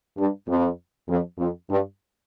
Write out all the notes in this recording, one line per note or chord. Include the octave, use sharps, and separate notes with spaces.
G2
F2
F2
F2
G2